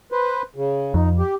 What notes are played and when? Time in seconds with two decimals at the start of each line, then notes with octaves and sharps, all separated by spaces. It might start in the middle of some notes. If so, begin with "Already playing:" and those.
0.12 B4 C5
0.56 C#3
0.94 F2 D#4
1.18 G4